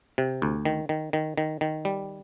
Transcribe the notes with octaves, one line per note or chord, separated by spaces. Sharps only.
C3
D2
D#3
D#3
D#3
D#3
D#3
G3